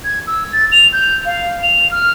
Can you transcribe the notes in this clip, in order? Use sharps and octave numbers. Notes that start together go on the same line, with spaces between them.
G#6
E6
A6
F7
G6
F5
F7
F6